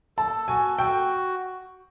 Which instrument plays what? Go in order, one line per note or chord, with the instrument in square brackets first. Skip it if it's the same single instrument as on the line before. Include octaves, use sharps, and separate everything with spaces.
[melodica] A4 [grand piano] A5
[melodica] F#4 [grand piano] G#5
[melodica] F#4 [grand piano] G5